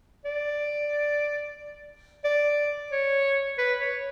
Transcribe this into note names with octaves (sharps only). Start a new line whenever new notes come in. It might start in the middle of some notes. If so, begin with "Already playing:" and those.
D5
D5
C#5
B4
C#5